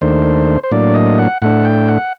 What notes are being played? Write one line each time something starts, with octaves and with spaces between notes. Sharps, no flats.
D#2 D#3 A3 D4 C5
C5
A2 F#3 A#3 D4 D5
D#5
F#5
A2 A3 D4 F#5
G5
F#5